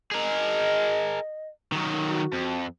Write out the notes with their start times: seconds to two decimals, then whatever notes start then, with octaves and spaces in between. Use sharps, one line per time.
0.11 G#4 A#4 D#5
1.72 D#3 F#3
2.06 F#4
2.33 F2